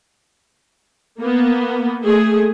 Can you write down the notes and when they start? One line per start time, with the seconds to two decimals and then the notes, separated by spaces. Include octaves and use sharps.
1.19 A#3 B3
2.03 A3 G#4